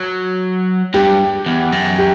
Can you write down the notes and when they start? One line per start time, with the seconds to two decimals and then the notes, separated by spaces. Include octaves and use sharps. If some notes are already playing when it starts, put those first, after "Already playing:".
Already playing: F#3
0.94 G2 G4
1.46 E2
1.72 F#2
1.98 G4